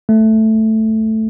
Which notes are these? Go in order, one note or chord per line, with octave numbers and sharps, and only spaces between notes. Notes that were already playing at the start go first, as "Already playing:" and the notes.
A3